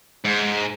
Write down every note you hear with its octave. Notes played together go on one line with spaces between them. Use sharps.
G#2